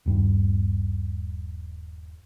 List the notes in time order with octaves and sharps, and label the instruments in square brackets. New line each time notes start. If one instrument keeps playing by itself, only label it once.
[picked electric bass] D#1 G2